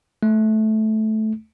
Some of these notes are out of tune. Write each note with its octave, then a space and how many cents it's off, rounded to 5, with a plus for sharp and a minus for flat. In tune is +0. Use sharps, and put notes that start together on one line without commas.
A3 -15